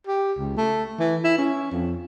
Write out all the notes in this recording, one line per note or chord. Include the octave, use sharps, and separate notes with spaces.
G4
C#2
A3
E3
E4
C#4
F2